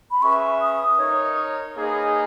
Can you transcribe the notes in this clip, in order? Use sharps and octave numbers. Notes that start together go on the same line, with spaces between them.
B5
C#4 G#4 B4 E5 C#6
D#6
D#4 A#4 C#5
A#3 D#4 G#4 B4 D#5